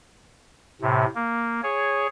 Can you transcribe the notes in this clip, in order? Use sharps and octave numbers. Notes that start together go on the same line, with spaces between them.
A2 C3
A#3
G#4 C#5